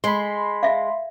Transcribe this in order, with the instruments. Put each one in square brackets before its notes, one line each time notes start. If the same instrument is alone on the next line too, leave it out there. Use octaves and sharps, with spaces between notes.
[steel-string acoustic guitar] G#3 [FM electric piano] B5 C6
[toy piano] E5 F5